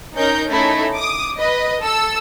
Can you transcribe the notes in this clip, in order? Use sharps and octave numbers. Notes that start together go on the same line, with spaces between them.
C#4 D#4 A#4 G6
A3 C#4 D#4 E4 A4
D6 D#6
B4 D#5
A4 E6